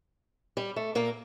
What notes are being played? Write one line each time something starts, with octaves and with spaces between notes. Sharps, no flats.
G3
A3
A#2 A#3